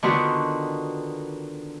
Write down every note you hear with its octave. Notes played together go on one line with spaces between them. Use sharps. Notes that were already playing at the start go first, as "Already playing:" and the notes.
D3 D#3 B3 F4 F#4